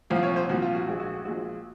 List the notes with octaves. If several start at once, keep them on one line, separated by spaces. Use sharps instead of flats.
C2 A#2 F3 F5
C#5
C5
C2 A#2 F3 F#4
F4
F#4
A#1 A#2 G#3 F#4
F#4
F#4
A#1 A#2 G#3 F#4